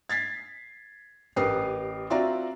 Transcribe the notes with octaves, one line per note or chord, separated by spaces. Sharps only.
G#6 A6 B6 C7
A1 G4 A#4 B4 D#6 C7
C4 F4 F#4 D5 E5 A#5